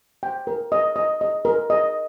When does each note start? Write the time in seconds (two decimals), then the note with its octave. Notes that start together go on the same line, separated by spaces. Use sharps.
0.23 G5
0.47 A#4
0.72 D#5
0.96 D#5
1.21 D#5
1.45 A#4
1.70 D#5